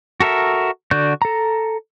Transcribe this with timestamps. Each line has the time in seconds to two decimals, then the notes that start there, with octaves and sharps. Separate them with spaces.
0.20 F#4 A4 A#4 E5
0.91 D3 F#4 D5 G6
1.22 A4 A#5